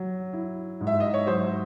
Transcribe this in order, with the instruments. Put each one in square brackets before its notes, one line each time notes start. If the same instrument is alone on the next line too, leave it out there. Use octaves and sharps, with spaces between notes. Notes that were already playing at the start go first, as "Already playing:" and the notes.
Already playing: [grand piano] F#3
E4
G#2
[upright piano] E5
D#5
C#5
[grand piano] F#3 [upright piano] C5